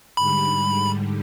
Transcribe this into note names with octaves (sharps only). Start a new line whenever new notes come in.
G#2 D3 G3 B5